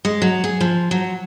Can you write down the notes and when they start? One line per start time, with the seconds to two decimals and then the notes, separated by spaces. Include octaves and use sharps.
0.05 G#3
0.22 F#3
0.44 G#4
0.61 F3
0.91 F#3